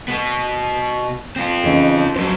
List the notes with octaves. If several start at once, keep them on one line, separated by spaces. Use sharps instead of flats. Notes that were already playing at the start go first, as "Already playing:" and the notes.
B2 B3
C4 F4
C#3 E3 D#4
F2 F#3 C5